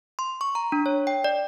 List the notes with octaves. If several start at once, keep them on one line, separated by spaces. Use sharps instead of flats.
C6
C#6
A#5
D4
C#5
G5
D5